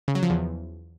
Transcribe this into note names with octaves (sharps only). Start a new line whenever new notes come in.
C#3
F#3
F3
E2